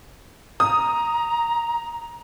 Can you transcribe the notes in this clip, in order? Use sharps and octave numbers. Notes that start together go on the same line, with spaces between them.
A#5 D#6